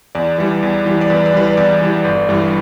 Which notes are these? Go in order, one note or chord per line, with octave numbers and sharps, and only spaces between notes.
E2 D5
E3 G3
E2
E3 G3
D5
E2 B4
D5
E3 G3 B4
D5
E2 D5
E3 G3
G1
G2 E3 G3